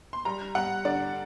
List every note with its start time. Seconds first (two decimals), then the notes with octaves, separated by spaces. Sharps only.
0.13 C6
0.25 G3 A#5
0.55 G3 F#5
0.85 D3 D5